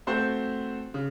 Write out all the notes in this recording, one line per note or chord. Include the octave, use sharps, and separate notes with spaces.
A3 C4 F#4 C5
C#3